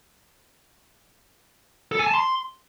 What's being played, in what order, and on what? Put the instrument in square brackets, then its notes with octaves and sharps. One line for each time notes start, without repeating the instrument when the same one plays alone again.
[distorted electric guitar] A4
G#5
A5
C6